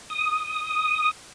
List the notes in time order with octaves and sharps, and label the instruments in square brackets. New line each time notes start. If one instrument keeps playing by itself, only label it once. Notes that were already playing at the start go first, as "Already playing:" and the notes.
[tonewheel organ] D#6